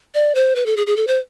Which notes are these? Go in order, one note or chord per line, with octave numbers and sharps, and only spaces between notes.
D5
C5
B4
A4
G#4
G#4
A4
C5